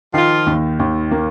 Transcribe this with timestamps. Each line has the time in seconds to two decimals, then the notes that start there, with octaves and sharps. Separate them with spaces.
0.14 D#3 F3 F4
0.46 D#2
0.79 D#2
1.11 A#3